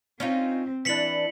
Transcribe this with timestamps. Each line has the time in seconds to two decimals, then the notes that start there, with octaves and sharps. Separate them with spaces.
0.20 C4 C#4 D#4 F4
0.85 E3 D4 E4 B6 C#7 F#7